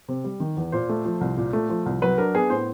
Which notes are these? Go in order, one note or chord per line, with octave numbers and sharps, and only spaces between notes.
C3
G3
D#3
E2
A#2 C5
A3
F3
C2
A#2
A3
F3
C2
F#3 B4
D4 A#4
B3 G#4
A2 C5